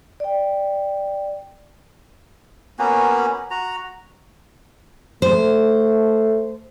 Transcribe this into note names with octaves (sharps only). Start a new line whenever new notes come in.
D5 G5
A#3 B3 C#4 F#4
F#4 A#5
A3 C5